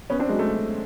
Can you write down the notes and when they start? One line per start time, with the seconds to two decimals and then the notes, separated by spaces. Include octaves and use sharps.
0.10 B3 C#4
0.19 C4 D4
0.29 F#3 G#3
0.39 A3